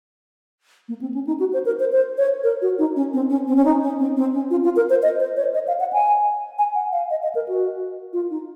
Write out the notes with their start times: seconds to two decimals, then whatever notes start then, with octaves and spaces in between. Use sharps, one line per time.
0.88 A#3
1.01 C4
1.14 C#4
1.27 D#4
1.40 F#4
1.53 C5
1.65 A#4
1.80 C5
1.92 C5
2.18 C#5
2.44 A#4
2.62 F#4
2.79 D#4
2.96 C#4
3.13 C4
3.29 C#4
3.47 C4
3.56 C#4
3.65 D#4
3.82 C#4
3.98 C4
4.17 C4
4.33 C#4
4.51 F4
4.64 F4
4.76 A#4
4.90 C5
5.02 D#5
5.19 C5
5.37 C#5
5.54 D#5
5.67 F5
5.80 F#5
5.93 G#5
6.58 G#5
6.75 F#5
6.92 F5
7.10 D#5
7.23 D#5
7.35 A#4
7.48 F#4
8.13 F4
8.30 D#4